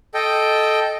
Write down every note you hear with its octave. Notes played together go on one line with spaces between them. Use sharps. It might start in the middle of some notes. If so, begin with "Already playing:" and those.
A4 D#5 G5